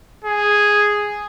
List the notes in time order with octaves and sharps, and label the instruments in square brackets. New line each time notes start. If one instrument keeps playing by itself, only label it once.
[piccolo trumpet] G#4